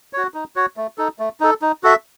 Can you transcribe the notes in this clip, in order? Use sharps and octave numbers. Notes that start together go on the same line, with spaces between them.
F#4 C#5
D#4
F#4 C#5
A3
D#4 A4
A3
D#4 A4
D#4
F#4 A4 E5